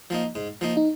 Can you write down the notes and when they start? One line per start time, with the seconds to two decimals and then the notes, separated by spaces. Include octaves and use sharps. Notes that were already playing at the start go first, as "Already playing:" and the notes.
0.10 F3 A#3 D#4
0.35 G#2
0.61 F3 A#3 D#4
0.77 D#4